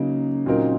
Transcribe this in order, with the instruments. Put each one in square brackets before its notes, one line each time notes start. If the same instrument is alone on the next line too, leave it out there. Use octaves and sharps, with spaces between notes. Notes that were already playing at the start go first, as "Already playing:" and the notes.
Already playing: [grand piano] C#3 F#3 A#3 D#4 [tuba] C#4
[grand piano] A#2 F#3 C4 D#4 A#4